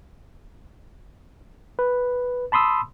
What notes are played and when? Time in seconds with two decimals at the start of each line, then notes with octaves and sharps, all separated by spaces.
1.79 B4
2.52 A5 B5 C6 D#6 E6